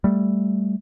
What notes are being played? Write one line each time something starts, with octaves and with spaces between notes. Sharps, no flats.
G3 A3